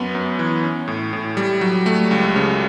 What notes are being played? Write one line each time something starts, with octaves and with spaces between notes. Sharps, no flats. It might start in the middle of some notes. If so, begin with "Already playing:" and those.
Already playing: F#2 B3
F#2
E3
C#4
A2
A2
G3
F#3
A3
C#2
C#3